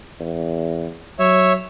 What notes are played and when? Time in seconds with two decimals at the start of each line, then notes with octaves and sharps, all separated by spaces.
0.20 E2
1.19 F#3 C#5 E5